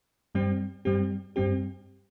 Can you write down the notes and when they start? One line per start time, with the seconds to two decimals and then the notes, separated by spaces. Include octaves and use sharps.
0.35 G2 G3 C4 G4
0.85 G2 G3 C4 G4
1.36 G2 G3 C4 G4